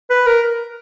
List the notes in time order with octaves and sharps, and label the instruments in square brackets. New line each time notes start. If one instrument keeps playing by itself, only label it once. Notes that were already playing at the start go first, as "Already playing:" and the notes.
[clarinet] B4
A#4